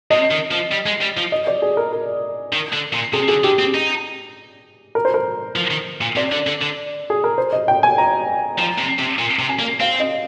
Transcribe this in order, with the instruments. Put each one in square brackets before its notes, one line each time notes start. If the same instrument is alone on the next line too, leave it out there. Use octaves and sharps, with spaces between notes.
[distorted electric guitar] C3 [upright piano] D#5
[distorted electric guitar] D#3
F3
G3
G#3
G3
F3
[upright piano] D#5
D5
G#4
A#4
A#4
[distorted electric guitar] D#3
D3
A#2
[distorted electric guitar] C3 [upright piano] G#4
[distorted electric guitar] D3 [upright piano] G#4
[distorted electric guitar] D3 [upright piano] G4
[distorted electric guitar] C4
D#4
[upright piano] A#4
C5
A#4
[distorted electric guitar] F3
D#3
A#2
[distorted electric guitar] C3 [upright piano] D5
[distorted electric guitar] D3
D3
D3
[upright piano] G#4
A#4
C5
D#5
G5
G#5
A#5
[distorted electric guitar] F3
C3
C3
A#2
C3
[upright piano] G#5
[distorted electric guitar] A#3
[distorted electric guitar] C4 [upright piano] F5
[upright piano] D#5